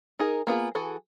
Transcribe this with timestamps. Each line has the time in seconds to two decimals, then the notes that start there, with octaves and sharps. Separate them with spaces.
0.19 D#4 G#4 A#4
0.47 A#3 B3 F4 G#4
0.75 E3 F#4 G#4 A4